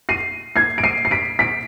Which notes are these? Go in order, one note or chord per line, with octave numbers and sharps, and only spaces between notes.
C7 D#7
G#6 C7
D7
C7 D#7
C7
B6 D7
B6 D7